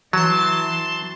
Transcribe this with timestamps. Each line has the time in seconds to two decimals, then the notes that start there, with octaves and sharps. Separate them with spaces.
0.13 E3 F#3 A5 C6